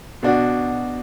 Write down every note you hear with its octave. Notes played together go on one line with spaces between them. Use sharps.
B2 D4 F#4